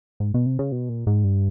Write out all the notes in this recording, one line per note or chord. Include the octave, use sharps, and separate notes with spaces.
G#2
B2
C3
C#3
B2
A#2
G#2
G2